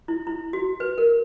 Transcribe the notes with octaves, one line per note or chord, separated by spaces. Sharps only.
E4
E4
F#4
B4
A#4